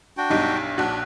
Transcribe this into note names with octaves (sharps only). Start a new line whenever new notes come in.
D4 F#4 G5
B1 G2 D#4 G4
A#1 D4 F#4 F#6